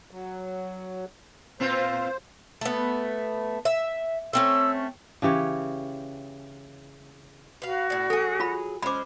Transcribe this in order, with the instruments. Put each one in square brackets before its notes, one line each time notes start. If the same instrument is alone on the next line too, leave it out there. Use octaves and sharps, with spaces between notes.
[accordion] F#3
[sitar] A#2 C4 F4 [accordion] C5
[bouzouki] A3 B3
E5
[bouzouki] A3 C4 C#4 [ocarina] E6
[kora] C#3 E3 G4 C#5
[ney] F#4 [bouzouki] B4 F5
[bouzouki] A2 D5
[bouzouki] F#3 G#4 [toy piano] A4
[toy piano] F4 B5
[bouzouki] G#3 C5 [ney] C#4 [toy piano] B5 D6